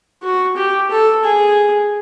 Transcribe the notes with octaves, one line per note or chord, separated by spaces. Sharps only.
F#4
G4
A4
G#4